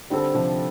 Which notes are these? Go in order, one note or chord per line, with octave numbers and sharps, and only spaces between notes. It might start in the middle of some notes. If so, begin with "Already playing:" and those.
D3 G3 C4 A4
C3 F3